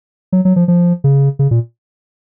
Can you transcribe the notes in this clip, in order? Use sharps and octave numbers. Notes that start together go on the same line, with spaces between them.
F#3
F#3
F3
F3
C#3
C#3
A#2